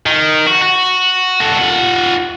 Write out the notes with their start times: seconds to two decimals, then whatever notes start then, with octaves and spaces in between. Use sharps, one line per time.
0.06 D#3
0.47 F#4
0.62 F#4
1.40 F#4 A4
1.58 F4 F#5